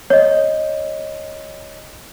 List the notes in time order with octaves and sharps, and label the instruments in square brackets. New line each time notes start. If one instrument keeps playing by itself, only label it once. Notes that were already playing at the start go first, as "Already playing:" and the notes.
[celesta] C#5 D#5